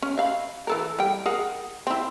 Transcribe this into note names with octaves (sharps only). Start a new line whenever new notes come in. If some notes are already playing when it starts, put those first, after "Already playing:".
C#4
E5 F5 B5
E3 A4 A#4
G3 G5
G#4 A#4 F#5
C4 E4